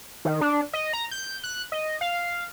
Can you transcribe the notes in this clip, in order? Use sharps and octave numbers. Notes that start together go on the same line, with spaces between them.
D#3
D4
D#5
A#5
G6
F#6
D#5
F5